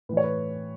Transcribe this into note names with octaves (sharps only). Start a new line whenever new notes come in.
A2 E3 B4 C#5
B4